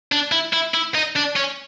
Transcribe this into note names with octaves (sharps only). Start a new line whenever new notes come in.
D4
E4
E4
E4
D#4
D4
C#4